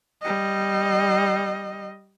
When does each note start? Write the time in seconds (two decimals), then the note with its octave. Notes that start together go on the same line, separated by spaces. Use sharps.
0.22 G3 D#5